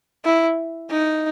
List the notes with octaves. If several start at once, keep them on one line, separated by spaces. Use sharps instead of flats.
E4
D#4